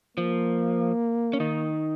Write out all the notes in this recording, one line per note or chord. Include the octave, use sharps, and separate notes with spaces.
F3 A#3
C#4
D#3 D#4